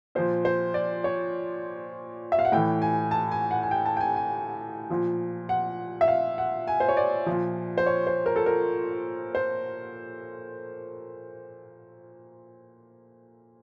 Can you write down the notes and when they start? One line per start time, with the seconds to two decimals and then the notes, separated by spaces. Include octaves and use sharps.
0.15 A#2 F3 C5
0.45 C5
0.74 D5
1.04 C#5
2.32 E5
2.39 F5
2.45 F#5
2.52 A2 E3 G5
2.82 G#5
3.11 A5
3.32 G#5
3.51 F#5
3.63 G#5
3.71 G5
3.86 A5
3.97 G5
4.01 G#5
4.16 G#5
4.90 A#2 F3
5.49 F#5
6.01 E5
6.08 F5
6.38 F#5
6.68 G#5
6.80 C5
6.89 C#5
6.97 D5
7.26 A#2 F3
7.78 C5
7.86 C#5
8.07 C5
8.26 A#4
8.36 A4
8.46 A#4
9.35 C5